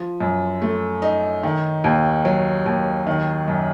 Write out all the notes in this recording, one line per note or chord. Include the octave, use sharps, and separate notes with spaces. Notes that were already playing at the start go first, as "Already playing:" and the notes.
Already playing: F3
F#2
A3
D#4
D#3
D#2
F#3
D#2
D#3
F#2